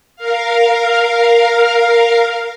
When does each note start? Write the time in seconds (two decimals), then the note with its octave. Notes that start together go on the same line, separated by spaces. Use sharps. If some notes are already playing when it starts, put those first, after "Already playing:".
0.16 A#4 F5